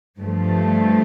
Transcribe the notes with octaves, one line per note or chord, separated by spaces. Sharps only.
G2 F3 A3